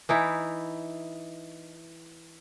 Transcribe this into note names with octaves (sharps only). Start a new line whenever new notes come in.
E3 D#4 E4